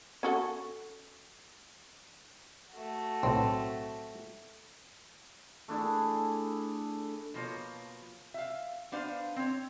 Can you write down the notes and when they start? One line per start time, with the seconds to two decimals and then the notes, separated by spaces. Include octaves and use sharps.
0.23 C#4 F#4 A4
2.73 A3 F#4
3.23 B1 A2 C4
5.68 A3 D4 E4 G#4
7.34 B2 F3 A#3 C#5
8.34 E5 F5
8.92 B3 D4 C5 F5
9.36 C4 C#5